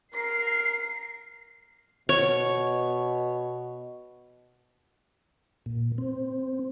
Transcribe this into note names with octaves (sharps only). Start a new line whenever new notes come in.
A#4 C7
B2 C#5
A#2
C4